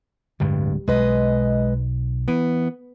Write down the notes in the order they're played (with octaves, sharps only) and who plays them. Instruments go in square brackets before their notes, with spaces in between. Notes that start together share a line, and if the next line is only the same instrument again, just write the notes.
[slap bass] D1 D3 G#3 [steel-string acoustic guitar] G2
[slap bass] B1 [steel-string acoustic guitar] G#3 B4 D#5
[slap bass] E3 [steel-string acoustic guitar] B3